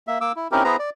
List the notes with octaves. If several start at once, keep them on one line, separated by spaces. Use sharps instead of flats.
A#3 E5
A#3 D6 E6
E4
C4 C#4 D#4 E4 G4 A#4
B3 E4 G#4 B4 C5 A#5
D5